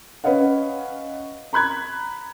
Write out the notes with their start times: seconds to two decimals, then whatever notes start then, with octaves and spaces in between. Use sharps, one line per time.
0.24 C#4 B4 C#5 D#5 F5 F#5
1.53 A#5 B5 F#6 G#6